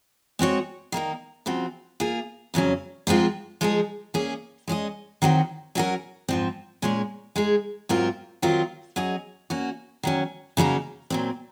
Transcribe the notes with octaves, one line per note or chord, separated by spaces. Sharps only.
G#3 C4 F#4 C#5
D#3 A#3 D#4 A#4
C#3 F3 C4 F#4
A#3 F4 G#4
F2 C#3 F#3 C#4
G#2 F3 G#3 C4 F4
F3 G#3 D#4 G#4
A#3 C#4 G#4
G#3 C#4 G#4 D#5
D#3 F#3 C4 F#4
F#3 C#4 F#4 A#4
G#2 F3 C4
A#2 G#3 C#4 G#4 C#5
G#3 D#4 G#4
G#2 F#3 C4 F4 A#4
D#3 F#3 C4 F4 A#4
F#3 C#4 G#4 D#5
A#3 C#4 F#4
D#3 F#3 C#4
C#3 F#3 A#3 D#4 A#4
A#2 F#3 C4